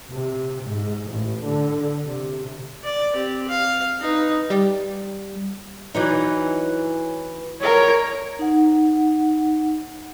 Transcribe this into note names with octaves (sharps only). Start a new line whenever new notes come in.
C3
G#2
A1
D3
C3
D5
C4 G4
F5
D#4 B4
G3
E3 F#3 D#4
A#4 C#5
D#4 F#5